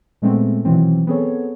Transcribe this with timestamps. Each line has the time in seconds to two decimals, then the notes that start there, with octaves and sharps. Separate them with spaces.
0.22 A#2 G#3 A3 B3 C4
0.65 B2 D#3 E3 F#3 C4
1.07 B3 C4 G#4 A4 C#5